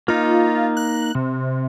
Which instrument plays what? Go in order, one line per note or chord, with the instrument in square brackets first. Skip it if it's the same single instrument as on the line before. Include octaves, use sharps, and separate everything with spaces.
[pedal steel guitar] A#3 D#4 [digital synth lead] F4
[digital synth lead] F#6
C3